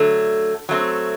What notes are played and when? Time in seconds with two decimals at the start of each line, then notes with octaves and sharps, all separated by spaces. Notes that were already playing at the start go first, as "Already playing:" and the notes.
Already playing: D3 F#3 A3
0.69 F#3 A3 C4